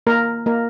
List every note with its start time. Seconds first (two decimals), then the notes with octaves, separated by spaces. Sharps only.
0.07 A#3 A#4
0.46 A#3 A#4